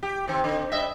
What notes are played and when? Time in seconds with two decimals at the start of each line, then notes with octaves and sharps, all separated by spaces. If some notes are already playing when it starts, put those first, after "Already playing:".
0.03 G4
0.27 C3 D#3 C4
0.44 D3 C4
0.72 G2 D#5 E5